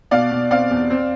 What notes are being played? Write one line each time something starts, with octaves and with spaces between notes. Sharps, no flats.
B2 D5 F5
B2
C4 D5 F5
E2
C4